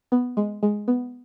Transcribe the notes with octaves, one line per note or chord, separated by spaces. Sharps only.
B3
G#3
G#3
B3